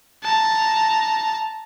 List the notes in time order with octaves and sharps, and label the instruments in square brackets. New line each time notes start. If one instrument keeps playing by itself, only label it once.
[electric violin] A5 A#5